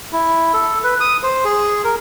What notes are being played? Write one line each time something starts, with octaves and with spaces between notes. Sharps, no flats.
E4
A4
B4
D#6
C5
G#4
A#4